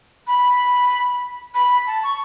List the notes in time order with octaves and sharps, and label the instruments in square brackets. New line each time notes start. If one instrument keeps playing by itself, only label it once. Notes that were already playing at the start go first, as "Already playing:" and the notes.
[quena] B5
B5
A5
C#6